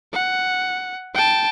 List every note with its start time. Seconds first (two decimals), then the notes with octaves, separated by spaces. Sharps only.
0.13 F#5
1.14 G5 A5